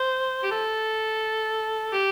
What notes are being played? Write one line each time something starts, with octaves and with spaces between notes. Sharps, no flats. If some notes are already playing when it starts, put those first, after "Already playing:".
Already playing: C5
G4
A4
G4